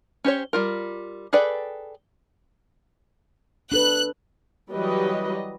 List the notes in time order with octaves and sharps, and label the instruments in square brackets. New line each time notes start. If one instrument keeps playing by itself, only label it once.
[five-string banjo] C#4 G4 C5 C#5
G3 F4 A#4
G#4 A4 B4 D5 G5
[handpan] D4 A4 B4 [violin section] F#6
[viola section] E3 F#3 G3 B4 D#5